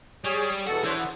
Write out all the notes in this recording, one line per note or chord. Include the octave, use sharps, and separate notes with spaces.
G3 G#4 C#5
E2 B2 F#4 A4
E3 D4 C5 C#5
B3